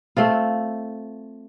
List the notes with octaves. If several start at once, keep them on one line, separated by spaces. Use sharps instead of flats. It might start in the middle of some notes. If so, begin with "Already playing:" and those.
A3 C4 F4